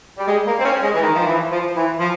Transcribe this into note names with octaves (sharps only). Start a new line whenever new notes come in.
G3
G#3
A#3
C4
C#4
G#3
E3
D#3
F3
E3
F3
E3
F3